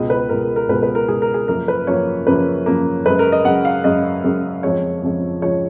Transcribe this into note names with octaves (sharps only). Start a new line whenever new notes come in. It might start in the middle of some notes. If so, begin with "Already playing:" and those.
Already playing: C#2 B2 G#3 D#5
B4
C#2 B2 G#3 A#4
A#4
A#4
C#2 B2 G#3 B4
B4
A#4
C#2 B2 G#3 G#4
A#4
G#4
F#2 C#3 F3 A#3 A#4
B4
F#2 C#3 F3 A#3 C#5
F#2 C#3 F3 A#3 B4
F#2 C#3 F3 A#3
F#2 C#3 G#3 B4
A#4
D#5
F#2 C#3 G#3 F#5
F5
F#2 C#3 G#3 D#5
F#2 C#3 G#3
F2 C#3 F3 G#3 C#5
F2 C#3 F3 G#3
C#3 F3 G#3 C#5